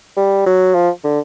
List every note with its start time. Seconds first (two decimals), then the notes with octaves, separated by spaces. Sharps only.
0.17 G3
0.46 F#3
0.75 F3
1.04 D3